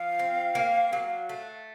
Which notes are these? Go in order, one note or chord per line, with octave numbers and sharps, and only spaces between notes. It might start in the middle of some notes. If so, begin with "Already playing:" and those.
Already playing: F3 F5
C4
A#3
F#3
A3